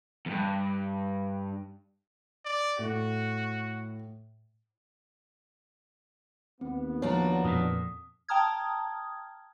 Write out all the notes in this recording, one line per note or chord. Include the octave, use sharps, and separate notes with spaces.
E2 G2
D5
A2 F#4
D#2 B3 C4
F3 D4 F#4 C#5 A#5
F2 A#2 D#6
G5 A5 A#5 D#6 F6 G#6